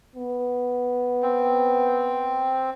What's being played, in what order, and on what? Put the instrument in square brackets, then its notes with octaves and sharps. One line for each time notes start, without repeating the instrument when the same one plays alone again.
[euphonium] B3
[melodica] C4